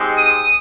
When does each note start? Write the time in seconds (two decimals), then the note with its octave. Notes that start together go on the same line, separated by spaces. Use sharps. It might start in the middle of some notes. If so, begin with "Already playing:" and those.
Already playing: G#3 C4 D#4 G4
0.17 D#6